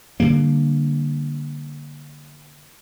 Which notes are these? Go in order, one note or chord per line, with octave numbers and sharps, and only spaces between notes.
D3 E3 G3 A#3